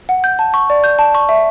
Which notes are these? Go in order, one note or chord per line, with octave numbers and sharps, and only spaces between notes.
F#5
G6
A5
C#6
D5
G6
A5
C#6
E5